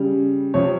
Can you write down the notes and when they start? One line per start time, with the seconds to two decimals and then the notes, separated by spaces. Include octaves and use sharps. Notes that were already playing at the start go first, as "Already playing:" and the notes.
Already playing: C#3 G3
0.54 C3 F3 C#5